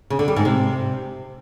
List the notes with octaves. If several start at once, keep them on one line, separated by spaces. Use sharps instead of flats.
C#3
D3
G3
G#2
C3